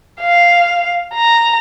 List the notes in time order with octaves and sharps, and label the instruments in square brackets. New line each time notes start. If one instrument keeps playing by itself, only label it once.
[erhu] F5
A#5